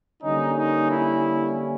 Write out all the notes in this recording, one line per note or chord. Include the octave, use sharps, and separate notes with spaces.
D3 G3 A#3 C#4 D#4
D#4
E4